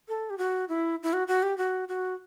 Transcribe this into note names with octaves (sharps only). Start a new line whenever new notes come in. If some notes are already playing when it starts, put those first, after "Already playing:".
A4
G4
F#4
E4
E4
F#4
F#4
G4
F#4
F#4